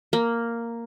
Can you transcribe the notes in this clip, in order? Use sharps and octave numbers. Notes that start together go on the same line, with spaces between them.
A#3